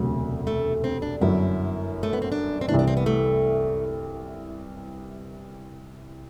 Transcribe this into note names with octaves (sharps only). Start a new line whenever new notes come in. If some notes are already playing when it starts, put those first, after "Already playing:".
Already playing: E1 D2 C3 F#3
A3
C4
D4
G1 F#2 F#3 E4
A3
B3
C4
D4
C4
C2 C3 E3 D4
D4
C4
B3
A3